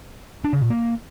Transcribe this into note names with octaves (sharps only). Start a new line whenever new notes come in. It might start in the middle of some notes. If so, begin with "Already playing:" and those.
D4
C#3
A#2
A#3